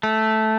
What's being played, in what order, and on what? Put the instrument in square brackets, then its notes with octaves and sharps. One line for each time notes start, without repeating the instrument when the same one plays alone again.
[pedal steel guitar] A3